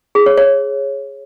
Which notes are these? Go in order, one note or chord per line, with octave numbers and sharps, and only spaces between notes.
G#4
C#5
C#5